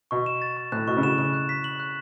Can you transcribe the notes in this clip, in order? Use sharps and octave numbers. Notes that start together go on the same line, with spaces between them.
B2 C#6
E7
A6
C#6
A2 F#6
B2 C#6
C#3
B2 E7
C#3 E7
F#6
B6
F#7
F#6